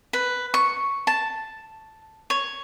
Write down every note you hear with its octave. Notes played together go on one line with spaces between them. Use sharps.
B4
C#6
A5
C#5